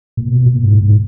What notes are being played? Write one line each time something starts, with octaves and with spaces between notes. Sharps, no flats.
A#2
B2
A#2
G#2
G#2